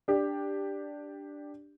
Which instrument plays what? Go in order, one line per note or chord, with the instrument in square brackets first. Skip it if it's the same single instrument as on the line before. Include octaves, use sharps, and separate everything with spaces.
[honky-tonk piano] D4 G4